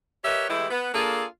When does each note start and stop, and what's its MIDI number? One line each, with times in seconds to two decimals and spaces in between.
0.25 0.46 67
0.25 0.46 70
0.25 0.46 71
0.25 0.46 73
0.25 0.46 75
0.25 0.46 76
0.50 0.66 52
0.50 0.66 56
0.50 0.66 57
0.50 0.66 64
0.50 0.66 67
0.70 0.89 59
0.94 1.25 58
0.94 1.25 62
0.94 1.25 65
0.94 1.25 68
0.94 1.25 69